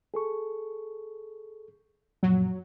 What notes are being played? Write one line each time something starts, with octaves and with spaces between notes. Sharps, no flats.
G#4 A4 C#6
F#2 A#2 F3 F#3